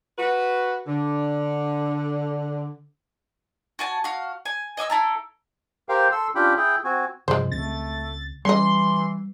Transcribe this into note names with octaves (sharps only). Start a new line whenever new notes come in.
F#4 B4
D3
F#4 G#5 A5
F#4 F5
G#5
D#5 G#5 D6 E6
E4 A4 A#5
G4 A#4 C5 F5 G5
A4 C6 E6
C#4 D4 F4 G4 G5 B5
E4 G#4 G5
C4 F#4 G#5
G2 C3 F3 G#3 C5
C#2 A3 C4 A6
E3 G3 C#4 D#5 C6